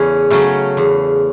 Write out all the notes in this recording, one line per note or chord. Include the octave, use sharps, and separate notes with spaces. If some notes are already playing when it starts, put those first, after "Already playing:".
Already playing: E2 C#3 A3 C#4
C#3 F#3 A3 C#4
E2